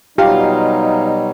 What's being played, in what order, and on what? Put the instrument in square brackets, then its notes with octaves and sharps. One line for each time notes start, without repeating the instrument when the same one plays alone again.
[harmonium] B2 F#3 G3 [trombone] D#4 [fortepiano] F4 [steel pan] G4